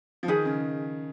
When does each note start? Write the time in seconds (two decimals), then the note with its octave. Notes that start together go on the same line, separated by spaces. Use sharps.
0.23 F3
0.28 D#3 D#4 G#4 B4
0.45 C#3